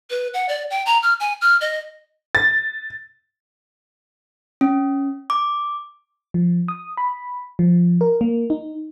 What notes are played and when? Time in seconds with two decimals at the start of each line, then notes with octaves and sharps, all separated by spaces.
0.11 B4
0.34 F#5
0.49 D5
0.70 G5
0.86 A#5
1.03 F6
1.20 G#5
1.41 F6
1.61 D#5
2.35 A6
4.61 C#4
5.30 D6
6.34 F3
6.68 D#6
6.97 B5
7.59 F3
8.01 A#4
8.21 A#3
8.50 D#4